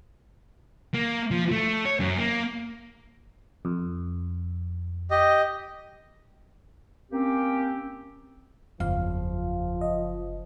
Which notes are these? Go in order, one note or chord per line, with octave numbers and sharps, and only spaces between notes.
A#3
F3
A3
C#5
F#2
A#3
F2
G4 D#5
A#3 C4 C#4 G4
F#1 E2 F3 F5
D#5